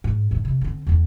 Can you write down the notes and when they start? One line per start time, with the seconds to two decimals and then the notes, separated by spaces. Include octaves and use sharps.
0.04 G#2
0.31 E2 A2
0.45 C3
0.61 D3 C4
0.87 E2 B3